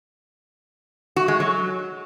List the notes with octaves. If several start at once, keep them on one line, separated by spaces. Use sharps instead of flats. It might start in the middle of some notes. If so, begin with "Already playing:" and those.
F#4
G#3
F#3